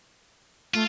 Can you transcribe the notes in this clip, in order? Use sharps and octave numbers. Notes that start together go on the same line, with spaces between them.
A3 F4